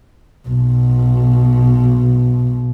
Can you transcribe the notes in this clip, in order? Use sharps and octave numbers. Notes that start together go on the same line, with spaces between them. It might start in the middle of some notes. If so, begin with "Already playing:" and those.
B1 B2